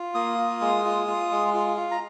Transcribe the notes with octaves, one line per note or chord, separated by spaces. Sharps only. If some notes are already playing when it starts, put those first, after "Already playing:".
Already playing: F4
A#3 D#6
F4
G#3
F4
F4
G#3
F4
F4
A#5